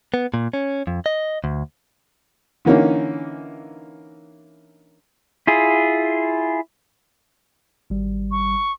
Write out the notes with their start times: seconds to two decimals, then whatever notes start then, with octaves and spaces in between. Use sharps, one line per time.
0.14 B3
0.34 A#2
0.53 C#4
0.87 F2
1.06 D#5
1.44 D2
2.65 D3 E3 A#3 C#4 D#4
5.47 E4 F4 G#4
7.90 G#1 G3
8.31 C#6